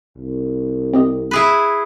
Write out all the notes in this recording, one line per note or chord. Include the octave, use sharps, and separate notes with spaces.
C2
C4 G4 D#5
E4 G#4 B4